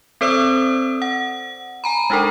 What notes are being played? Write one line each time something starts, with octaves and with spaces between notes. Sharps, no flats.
C4 A4 C5 D5 D#6 E6
F#5
G#5 A#5 B5
G#3 D4 D#4 A4 A#4